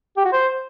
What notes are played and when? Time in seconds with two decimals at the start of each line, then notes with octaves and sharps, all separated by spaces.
0.17 G4
0.25 F#4
0.33 C5